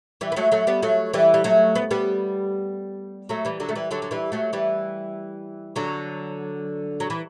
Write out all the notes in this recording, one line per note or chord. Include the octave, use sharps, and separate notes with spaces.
E3 G3
B3
F#3 A3
F#3 A3
G3 B3
F#3 A3
E3 G3
G3
F#3 A3
B3
G3 B3
F#3 A3
E3 G3
D3 F#3
A3
E3 G3
D3 F#3
F#3
E3 G3
F#3 A3
E3 G3
D3 F#3
F#3
E3